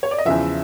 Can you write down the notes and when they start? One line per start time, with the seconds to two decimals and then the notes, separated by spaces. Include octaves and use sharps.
0.03 C#5
0.11 D5
0.18 D#5
0.25 E2 C#3 F3 E5